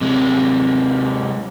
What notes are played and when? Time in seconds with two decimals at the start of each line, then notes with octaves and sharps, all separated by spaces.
0.01 C3 G#3